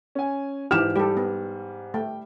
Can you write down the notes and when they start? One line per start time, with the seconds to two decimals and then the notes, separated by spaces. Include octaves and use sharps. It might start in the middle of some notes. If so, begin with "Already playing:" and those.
0.15 C#4 G#5
0.71 G#2 E3 G4 F6 E7
0.96 G3 G4 A4
1.17 B3
1.94 A3 G5